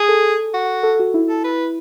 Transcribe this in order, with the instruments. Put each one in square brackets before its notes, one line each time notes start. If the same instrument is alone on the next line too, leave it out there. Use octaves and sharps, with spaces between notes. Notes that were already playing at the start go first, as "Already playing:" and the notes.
Already playing: [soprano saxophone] G#4
[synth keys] A4
[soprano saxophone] F#4
[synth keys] A4
F#4
E4
[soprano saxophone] A4
B4